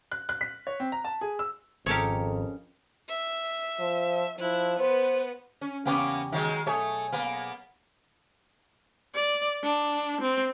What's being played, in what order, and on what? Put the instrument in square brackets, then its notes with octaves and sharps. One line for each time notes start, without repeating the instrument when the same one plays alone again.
[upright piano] F#6
F#6
B6
C#5
C4
A#5
A5
G#4
E6
[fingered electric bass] G#1 [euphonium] F2 [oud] C#3 A#4 [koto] G4 A4 C#5
[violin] E5
[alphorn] F3
[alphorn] F3 [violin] E4 F#6
[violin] B3 B4 [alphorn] C5
[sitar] C#4
[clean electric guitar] E2 C#3 G4 [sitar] A#3 B3 C#4
[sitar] D#3 F#3 G#3
[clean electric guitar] B1 G#4 [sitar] A3 C#5
[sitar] A#3 B3
[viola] D5
D4
C4